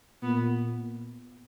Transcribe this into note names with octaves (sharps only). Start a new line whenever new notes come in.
A#2 B3